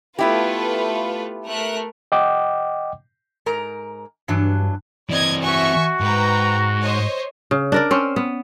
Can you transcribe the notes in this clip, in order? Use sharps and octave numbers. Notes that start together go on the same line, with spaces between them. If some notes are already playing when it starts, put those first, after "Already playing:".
A3 B3 E4 F4 G4 B4
A3 A#4 F#6
D#5 F#5 G5 D6
G#2 A#4 A#5
G2 E3 F#3 D4
E3 C4 D5 D#5 G#6
F#4 E5 G#5 C#6
G#2 B4 G5 A#5
C5 C#5 D#5
C#3
D4 A#4 D5
C4 C#4 C5
B3